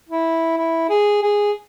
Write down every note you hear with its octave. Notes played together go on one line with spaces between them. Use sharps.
E4
E4
G#4
G#4